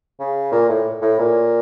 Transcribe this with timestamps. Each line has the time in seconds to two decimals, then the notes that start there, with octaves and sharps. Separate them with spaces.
0.20 C#3
0.52 A#2
0.69 A2
1.02 A2
1.19 A#2